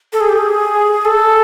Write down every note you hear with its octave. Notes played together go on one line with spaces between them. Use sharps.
A4
G#4
G4
G#4
A4